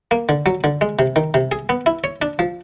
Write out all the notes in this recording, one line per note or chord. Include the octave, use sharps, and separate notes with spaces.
A#3
D3
F#3
D3
G#3
C3
D#3
C3
G#4
B3
E4
C#5
D4
F3